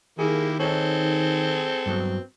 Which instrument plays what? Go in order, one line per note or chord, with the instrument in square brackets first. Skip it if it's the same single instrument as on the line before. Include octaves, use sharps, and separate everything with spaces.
[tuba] D#3 [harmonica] A#3 E4 G4 [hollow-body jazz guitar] G#4
[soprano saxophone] C4 [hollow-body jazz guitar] D#4 C#5 [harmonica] G#4 A4
[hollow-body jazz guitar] G2 F#3 B3